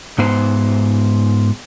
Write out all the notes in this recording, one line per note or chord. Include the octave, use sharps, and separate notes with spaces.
G#2 B3 C5